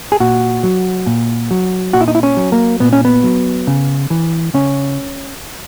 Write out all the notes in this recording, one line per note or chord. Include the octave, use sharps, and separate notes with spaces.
G#4
A#2 F#4
F#3
A#2
F#3
A#2 F#4
E4
D#4
E4
C#4
F#3
A#3
A#2 B3
C#4
B3
F#3
C#3
E3
C#3 C#4